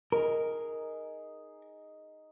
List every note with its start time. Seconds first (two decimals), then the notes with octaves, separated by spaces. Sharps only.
0.12 D#4 G#4 A#4